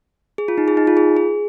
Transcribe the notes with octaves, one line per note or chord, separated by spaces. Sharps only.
G#4
F4
D#4
G#4
D#4
F4
G#4
G#4